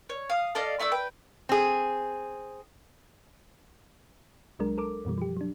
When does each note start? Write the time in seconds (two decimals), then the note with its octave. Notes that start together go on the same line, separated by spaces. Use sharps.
0.10 C#5
0.30 F5 D#6
0.55 A4 D5 D#5 F5
0.79 A3 E4 D5 E6
0.92 B4 G5
1.49 C4 G#4
4.59 C2 F#3 G#3 D4 A#4
4.78 A4 A#4 D6
5.05 F#2 B2 E3 G3
5.18 F3 G4
5.37 F#3 D4